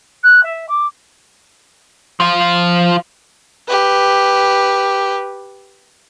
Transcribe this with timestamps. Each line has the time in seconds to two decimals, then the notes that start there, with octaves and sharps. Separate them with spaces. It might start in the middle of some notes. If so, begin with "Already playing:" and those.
0.23 F#6
0.43 E5
0.69 D6
2.20 F3 F4
3.68 G4 B4